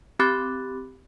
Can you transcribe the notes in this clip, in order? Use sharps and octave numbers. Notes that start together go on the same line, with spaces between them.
C4 G4 B5 D6 F#6 A6